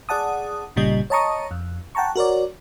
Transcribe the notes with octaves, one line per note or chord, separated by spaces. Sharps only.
G#4 D5 F#5 A5 D#6
G1 A#2 C#3 G3 D#5
C#5 D#5 A5 A#5 C#6 D#6
F2
F#5 G5 A5 A#5 C#6
F#4 A#4 C#5 D5